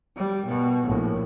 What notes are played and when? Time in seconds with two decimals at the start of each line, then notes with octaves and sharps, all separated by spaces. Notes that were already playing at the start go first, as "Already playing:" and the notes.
0.16 G3
0.47 B2
0.83 A#1 A2